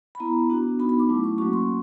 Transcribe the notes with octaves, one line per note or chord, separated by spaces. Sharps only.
B5
B3 E4 A#5
B3 D4 F#4
B3 D#4 F#4 B5
B5
D6
F#3 A3 C#4 E4
C#6
F#3 A#3 C#4 F#4 C#6
C6